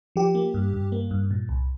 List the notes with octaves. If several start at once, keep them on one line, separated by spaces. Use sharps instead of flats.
F3 G4
A#3
G2
G2
A#3
G2
A#2
C2